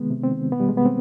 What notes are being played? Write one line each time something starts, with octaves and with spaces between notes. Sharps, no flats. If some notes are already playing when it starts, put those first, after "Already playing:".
Already playing: C3 D#3 G#3 B3
C3
C4
D#3
B2 B3
G3
G#3
B2 B3
C4